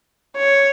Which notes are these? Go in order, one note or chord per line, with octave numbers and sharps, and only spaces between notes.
C#5